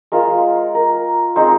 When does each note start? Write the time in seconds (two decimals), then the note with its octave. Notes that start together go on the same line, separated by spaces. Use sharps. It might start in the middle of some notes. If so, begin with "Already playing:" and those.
0.12 G#3 F4 A#4
0.75 A#4
1.36 G#3 C4 D#4 C5